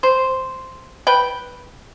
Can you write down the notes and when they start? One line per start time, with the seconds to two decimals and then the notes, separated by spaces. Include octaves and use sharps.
0.03 C5
1.07 B4 G5